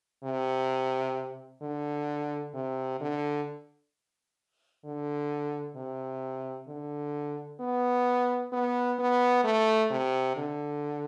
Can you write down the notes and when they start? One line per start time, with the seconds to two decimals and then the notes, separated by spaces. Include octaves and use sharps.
0.24 C3
1.62 D3
2.54 C3
3.01 D3
4.85 D3
5.76 C3
6.68 D3
7.60 B3
8.53 B3
8.99 B3
9.44 A3
9.91 C3
10.37 D3